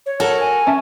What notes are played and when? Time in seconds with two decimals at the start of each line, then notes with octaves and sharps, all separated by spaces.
0.06 C#5
0.20 F#4 A4 A#4 A5
0.40 G#5
0.67 C#4 E5 A5